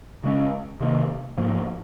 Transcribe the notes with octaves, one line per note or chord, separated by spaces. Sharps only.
C#3 G#3 C#4
C3 D#3 A#3
G#2 F3 A#3